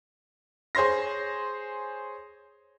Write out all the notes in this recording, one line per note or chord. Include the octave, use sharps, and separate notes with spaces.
G#4 C5 C#5 C6 A#6